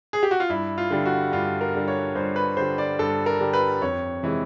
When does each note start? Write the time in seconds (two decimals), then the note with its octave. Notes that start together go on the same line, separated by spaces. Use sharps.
0.13 G#4
0.23 G4
0.31 F#4
0.40 F4
0.50 G2 E4
0.78 F4
0.91 D3 G3
1.06 F#4
1.32 G2 F4
1.61 A#4
1.75 D3 G3
1.88 C#5
2.15 G2 C5
2.36 B4
2.57 D3 G3 C5
2.78 D5
2.99 G2 A4
3.26 A#4
3.40 D3 G3
3.53 B4
3.82 F2 C#5
4.23 C3 E3 G#3